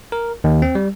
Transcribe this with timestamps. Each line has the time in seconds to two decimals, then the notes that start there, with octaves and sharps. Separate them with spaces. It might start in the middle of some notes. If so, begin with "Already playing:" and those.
0.12 A#4
0.44 D#2
0.62 C4
0.75 G3